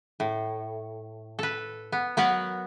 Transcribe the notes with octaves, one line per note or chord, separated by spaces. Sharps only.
A2
A4 B4
B3
F#3 B3 A#4 B4 F#5